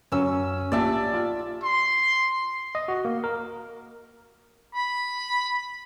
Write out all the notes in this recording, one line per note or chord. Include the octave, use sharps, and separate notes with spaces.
F#2 C#4 E6
A#1 G4 D5 E5 A5
F4
C6
D#5
F#4
A#3
A#4
B5